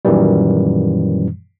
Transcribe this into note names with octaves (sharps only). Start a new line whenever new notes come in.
F#2 A#2 D#3 E3 G3